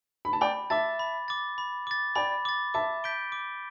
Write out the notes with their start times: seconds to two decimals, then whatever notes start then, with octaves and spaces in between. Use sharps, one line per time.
0.25 B5
0.33 A5
0.41 D5 G5 B5
0.70 E5 A5 D6 A6
0.99 B5
1.28 D6 A6
1.58 B5
1.87 D6 A6
2.15 D5 G5 B5
2.45 D6 A6
2.74 E5 A5 D6
3.04 G6 B6 D7 G7
3.32 D6